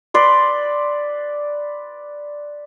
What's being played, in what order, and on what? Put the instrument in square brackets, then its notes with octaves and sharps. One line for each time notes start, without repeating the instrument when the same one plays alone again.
[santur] B4 D5 C6